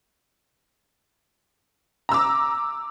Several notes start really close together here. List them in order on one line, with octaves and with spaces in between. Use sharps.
A#5 E6 D6